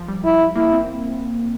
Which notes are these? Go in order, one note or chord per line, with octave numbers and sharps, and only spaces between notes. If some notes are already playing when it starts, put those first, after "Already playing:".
Already playing: F3
G3
E4
A#3 E4
C4